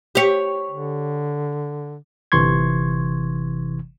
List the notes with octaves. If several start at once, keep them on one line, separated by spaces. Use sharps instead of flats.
G4 C#5
D3
G1 C3 E3 C6 C#6 G#6